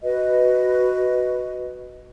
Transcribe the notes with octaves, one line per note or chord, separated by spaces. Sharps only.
F#4 B4 D#5